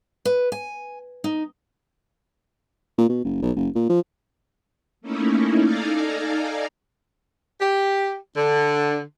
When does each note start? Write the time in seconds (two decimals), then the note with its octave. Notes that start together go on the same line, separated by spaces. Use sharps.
0.25 B4
0.52 G#5
1.24 D#4
2.98 A#2
3.09 B2
3.24 F#1
3.42 B1
3.56 F#1
3.75 A#2
3.89 F3
5.01 A3 A#3 C#4 D#4 E4
5.62 D#4 A4 D5 F5 G#5 A#5
7.59 G4
8.35 D3